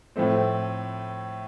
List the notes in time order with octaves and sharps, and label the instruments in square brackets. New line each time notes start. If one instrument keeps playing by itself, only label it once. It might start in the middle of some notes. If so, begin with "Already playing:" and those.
[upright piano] A2 F3 A3 C4